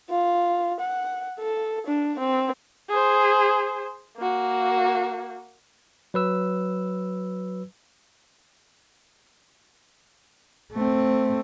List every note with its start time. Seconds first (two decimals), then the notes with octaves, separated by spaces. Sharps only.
0.10 F4
0.80 F#5
1.39 A4
1.87 D4
2.19 C4
2.90 G#4 C5
4.17 A#3 F#4
6.14 F#3 B4 E6
10.73 A3 C4